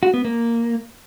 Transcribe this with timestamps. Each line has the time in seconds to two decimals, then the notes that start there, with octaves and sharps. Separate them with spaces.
0.03 F#4
0.14 B3
0.25 A#3